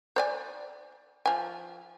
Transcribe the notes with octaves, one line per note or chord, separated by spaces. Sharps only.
C5 D5 G#5
F3 G#5